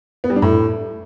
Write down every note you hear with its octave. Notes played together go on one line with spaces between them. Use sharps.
B3
G3
D4
A2